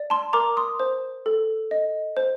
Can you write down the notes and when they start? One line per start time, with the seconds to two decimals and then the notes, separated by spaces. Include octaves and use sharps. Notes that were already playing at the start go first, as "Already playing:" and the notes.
Already playing: D5
0.10 A5 C6
0.33 A#4 A#5 D6
0.57 C6 D#6
0.80 C5
1.26 A4
1.71 D#5
2.17 C5